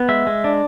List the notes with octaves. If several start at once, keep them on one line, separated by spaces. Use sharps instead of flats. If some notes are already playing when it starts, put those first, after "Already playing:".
Already playing: B3
G#3 E5
G#3
D4